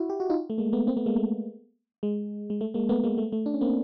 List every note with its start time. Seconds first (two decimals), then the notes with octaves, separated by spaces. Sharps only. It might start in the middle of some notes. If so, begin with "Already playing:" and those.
Already playing: E4 F#4
0.10 G4
0.20 F#4
0.30 D#4 F4
0.50 A3
0.58 G#3 A#3
0.72 A3 B3
0.87 A#3 C4
0.96 A3 B3
1.06 G#3 A#3
1.16 A3
2.03 G#3
2.50 G#3
2.61 A3
2.74 G#3 A#3
2.89 A3 B3
3.04 G#3 A#3
3.18 A3
3.32 A3
3.46 D4
3.54 C#4
3.61 A#3 C4